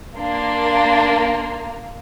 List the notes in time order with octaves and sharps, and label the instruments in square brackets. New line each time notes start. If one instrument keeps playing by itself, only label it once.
[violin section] A#3 [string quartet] D4 C6